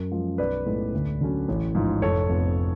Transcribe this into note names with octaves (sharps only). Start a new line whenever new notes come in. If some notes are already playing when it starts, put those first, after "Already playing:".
Already playing: F#2
F3 G#3
B1 B4 D5
A2 G#3 B3
D2
D3 F#3 C#4
A1
G#2 F3
F1 A4 C#5
F2 F3 B3